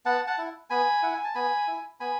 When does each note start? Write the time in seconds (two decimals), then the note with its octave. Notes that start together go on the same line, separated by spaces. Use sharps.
0.06 B3 F#5 A5
0.27 F#5 A5
0.38 E4
0.70 B3 G#5 B5
1.03 E4 F#5
1.14 G#5
1.24 A5
1.35 B3 G#5 B5
1.67 E4
2.00 B3 G#5 B5